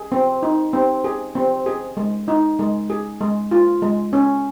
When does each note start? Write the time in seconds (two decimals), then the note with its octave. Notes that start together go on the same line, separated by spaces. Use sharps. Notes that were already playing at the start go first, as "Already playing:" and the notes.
Already playing: G#4
0.12 C4
0.43 D#4
0.73 C4
1.04 G#4
1.35 C4
1.66 G#4
1.97 G#3
2.28 D#4
2.59 G#3
2.90 G#4
3.21 G#3
3.51 F4
3.82 G#3
4.13 C#4